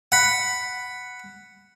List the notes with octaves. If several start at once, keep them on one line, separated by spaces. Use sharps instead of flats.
F#5 B5